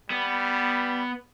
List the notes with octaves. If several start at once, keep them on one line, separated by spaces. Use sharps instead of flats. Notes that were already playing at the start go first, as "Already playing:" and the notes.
G3 B3